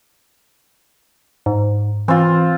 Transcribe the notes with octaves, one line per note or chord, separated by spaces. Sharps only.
G#2
E3 C4 F4